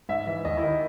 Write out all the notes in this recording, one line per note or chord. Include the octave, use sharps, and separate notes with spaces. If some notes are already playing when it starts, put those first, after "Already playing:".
G#2 E5
E3 E5
D#2 D#5
E4
D#3